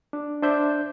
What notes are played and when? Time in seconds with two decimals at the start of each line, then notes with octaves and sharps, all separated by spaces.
0.13 D4
0.43 D4 C5 E5 G6